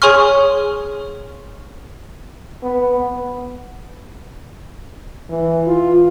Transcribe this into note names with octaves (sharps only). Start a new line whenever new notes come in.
G#4 C#5 G#5 C6 C#6 F6
B3
E3
F4